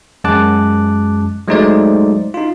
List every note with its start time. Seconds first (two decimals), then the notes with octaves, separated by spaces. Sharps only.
0.24 F#2 G#3 A5 D6 F#6
1.48 F#3 G#3 A3 D#4 C5 D5
2.34 D#4 F4